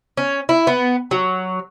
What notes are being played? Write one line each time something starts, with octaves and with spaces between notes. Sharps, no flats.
C#4
E4
B3
F#3